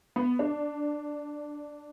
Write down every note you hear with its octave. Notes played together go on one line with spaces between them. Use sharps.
B3
D4